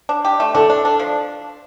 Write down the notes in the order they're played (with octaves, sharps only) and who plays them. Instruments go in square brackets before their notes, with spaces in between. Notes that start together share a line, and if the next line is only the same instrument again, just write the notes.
[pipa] D4
G4
A3
[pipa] D4 [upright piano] A4
[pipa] D4
D4
F3